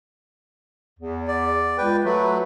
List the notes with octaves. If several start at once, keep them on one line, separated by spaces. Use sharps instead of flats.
E2
D5
C#2 B4 G5
F#3 A3 B4